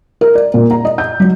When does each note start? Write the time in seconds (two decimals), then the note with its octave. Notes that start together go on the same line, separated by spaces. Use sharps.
0.21 A#4
0.35 D5
0.54 A#2
0.71 A#5
0.85 D#5
0.98 G6
1.20 F#3